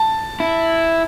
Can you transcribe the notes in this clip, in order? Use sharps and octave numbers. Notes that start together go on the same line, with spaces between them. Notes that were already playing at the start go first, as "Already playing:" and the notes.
Already playing: A5
E4